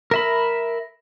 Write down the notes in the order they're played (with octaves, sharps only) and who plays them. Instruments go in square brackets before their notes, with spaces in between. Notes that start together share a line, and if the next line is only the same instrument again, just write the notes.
[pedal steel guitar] A#4 E5 B5